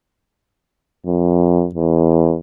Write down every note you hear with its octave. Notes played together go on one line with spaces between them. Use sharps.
F2
E2